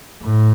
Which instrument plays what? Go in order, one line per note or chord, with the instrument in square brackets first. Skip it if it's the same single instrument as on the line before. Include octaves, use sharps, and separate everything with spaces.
[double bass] A2